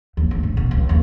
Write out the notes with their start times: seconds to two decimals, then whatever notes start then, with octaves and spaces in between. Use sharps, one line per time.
0.17 D#2
0.31 D2
0.43 A2
0.57 B2
0.71 C#2
0.89 D#2